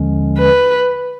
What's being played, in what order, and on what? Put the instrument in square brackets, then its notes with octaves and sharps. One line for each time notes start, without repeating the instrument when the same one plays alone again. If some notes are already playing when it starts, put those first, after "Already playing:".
Already playing: [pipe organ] D#2 D3 F3 G#3 C#4
[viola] B4